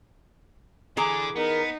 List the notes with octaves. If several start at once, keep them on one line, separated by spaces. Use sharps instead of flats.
D3 E3 G#4 G#5 A#5 D6
B3 D#4 A#4